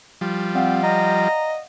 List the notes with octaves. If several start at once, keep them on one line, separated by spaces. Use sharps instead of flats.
F3 G3
C4 D5 F5 F#5
D#5 A#5